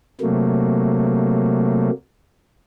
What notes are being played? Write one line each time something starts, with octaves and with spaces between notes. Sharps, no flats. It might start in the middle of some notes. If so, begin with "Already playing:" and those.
C3 F#3 A3 A#3